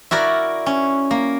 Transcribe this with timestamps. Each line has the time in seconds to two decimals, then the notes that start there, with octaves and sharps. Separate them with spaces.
0.11 E4 F#4 A#4 D5
0.66 C#4
1.11 A#3